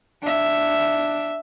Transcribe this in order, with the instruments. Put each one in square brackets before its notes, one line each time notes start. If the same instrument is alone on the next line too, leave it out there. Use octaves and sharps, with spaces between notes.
[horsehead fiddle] D4 E5